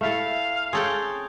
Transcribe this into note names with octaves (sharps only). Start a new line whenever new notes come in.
A3 E4 A4 F5
C4 C#4 G#4 A4 G5